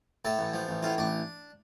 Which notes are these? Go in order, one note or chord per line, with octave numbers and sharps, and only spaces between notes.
A2 A4
A1
F3
A1
A2 F4
A1 D4